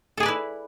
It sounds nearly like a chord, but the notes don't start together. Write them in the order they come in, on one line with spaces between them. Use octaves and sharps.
A4 G#4 D5 B4 E4